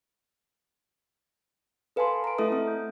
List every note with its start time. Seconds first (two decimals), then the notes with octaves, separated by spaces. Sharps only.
1.96 A4 B4 F5 G#5 A5 C6
2.24 A#5 D7
2.38 A3 E4 A4 E5 D#6
2.52 C4
2.68 G6